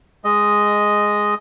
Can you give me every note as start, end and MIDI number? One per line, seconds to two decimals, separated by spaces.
0.24 1.34 56
0.24 1.34 75